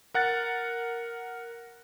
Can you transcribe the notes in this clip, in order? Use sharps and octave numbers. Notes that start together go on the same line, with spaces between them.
A#4 F#5 F#6 A6